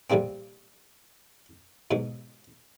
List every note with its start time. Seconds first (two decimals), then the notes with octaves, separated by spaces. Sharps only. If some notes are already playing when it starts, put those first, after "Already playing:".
0.10 A#1 C3 G3 A#3 C4
1.91 G#2 B2 F#3